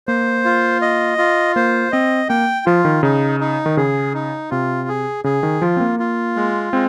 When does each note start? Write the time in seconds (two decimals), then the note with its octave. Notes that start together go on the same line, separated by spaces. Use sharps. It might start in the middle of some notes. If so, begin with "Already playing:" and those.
0.07 A#3 C5
0.45 F4
0.82 D#5
1.18 F4
1.56 A#3 C5
1.92 C4 D#5
2.29 A#3 G5
2.66 F3 F4
2.85 D#3
3.03 C#3 D#4
3.40 D#4
3.66 D#3
3.77 C#3 G#4
4.14 D#4
4.51 C3 F4
4.89 G#4
5.24 C#3 G#4
5.43 D#3
5.62 F3 F4
5.77 C4
5.80 A#3
5.99 F4
6.36 G#3
6.73 G#3 C4